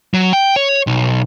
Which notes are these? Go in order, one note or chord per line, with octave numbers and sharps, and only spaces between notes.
F#3
G5
C#5
B1